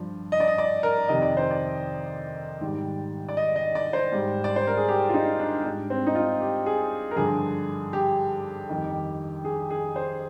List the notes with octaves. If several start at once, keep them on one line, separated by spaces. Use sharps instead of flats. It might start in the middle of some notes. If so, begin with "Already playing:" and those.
Already playing: G2 F3
D#5
D5
D#5
D5
A#4
F2 C3 D#3 D#5
D5
C5
D5
G#2 D#3 G3
D5
D#5
D#5
D5
C5
G#2 G3
D5
C5
A#4
G#4
G4
F4
D#4
D4
G#2 G3 D4
C4
D#4
F4
G4
G#4
A#4
G2 D3 F3 G#4
G4
F2 D#3 G3
G#4
G#4
C5